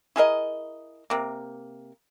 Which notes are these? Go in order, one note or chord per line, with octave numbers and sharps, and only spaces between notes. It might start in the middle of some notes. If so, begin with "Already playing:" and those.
E4 G#4 A#4 D#5
C3 A#3